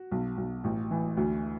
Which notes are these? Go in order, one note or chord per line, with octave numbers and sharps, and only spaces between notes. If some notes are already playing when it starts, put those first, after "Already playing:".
Already playing: F#4
B1
B1
A1
E3
D2